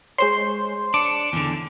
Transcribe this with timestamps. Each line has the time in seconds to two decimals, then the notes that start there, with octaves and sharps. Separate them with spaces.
0.18 G#3 C5 C#5 C6
0.94 D4 D6 C#7 D7
1.33 E2 D3